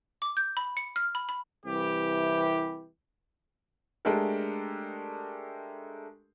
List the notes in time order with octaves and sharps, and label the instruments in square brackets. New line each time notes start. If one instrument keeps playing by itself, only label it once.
[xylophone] D6
G6
B5
C#7
F6
B5
B5
[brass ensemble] C2 E3 G4
[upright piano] G#3 A3 D4 G4 A4 A#4